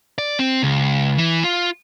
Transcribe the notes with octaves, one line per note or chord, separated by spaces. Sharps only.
D5
C4
C#2
E3
F4